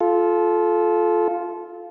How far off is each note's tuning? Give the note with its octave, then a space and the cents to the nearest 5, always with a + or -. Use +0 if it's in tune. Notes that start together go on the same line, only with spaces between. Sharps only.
F4 +0 A4 -25